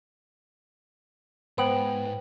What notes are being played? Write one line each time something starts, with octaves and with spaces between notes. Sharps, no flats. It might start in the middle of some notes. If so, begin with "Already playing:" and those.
G#2 B3 C5 G5 D7 F#7